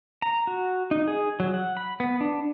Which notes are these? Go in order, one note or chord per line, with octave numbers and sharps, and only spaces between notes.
A#5
F#4
D#4
G#4
F#3
F#5
B5
B3
D4